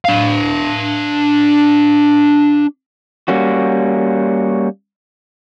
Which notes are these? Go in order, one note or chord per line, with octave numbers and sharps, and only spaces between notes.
D4 F5
G3 A#3 C#4 F#4